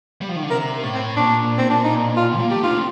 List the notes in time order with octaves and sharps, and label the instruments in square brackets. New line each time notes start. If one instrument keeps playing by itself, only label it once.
[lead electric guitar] G3
F3
D#3
D3
[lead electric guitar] C3 [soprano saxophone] A#4
[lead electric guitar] A2
[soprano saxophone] C4
[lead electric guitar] A#2 [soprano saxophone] D4
[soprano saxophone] C4
D4
D#4
F4
[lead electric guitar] A#3
[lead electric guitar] A3 [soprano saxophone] G4
[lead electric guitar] D#4 [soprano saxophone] F4
[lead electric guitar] D4
C4